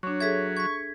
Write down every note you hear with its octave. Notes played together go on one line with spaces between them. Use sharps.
F#3 D4 C#5 C#6
G#4 A4 E5 G#6 B6
C#6 G#6 B6